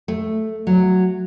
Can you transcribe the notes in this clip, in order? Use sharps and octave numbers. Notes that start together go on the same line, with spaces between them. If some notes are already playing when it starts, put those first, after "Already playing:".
A3
F#3